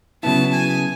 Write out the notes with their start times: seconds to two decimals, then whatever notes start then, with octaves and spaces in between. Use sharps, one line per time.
0.23 C#3 F#3 B3 E4 A5
0.54 G#5